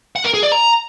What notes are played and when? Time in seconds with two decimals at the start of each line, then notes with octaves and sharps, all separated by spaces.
0.16 F#5
0.25 A#4
0.34 G#4
0.43 D5
0.52 A#5